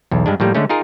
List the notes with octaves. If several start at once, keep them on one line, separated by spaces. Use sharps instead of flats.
B1 E2
G2 G#3 D4
A2 F3 G3 A#3
D3 G#3 A3 C#4
D#4 F4 G#4 A#4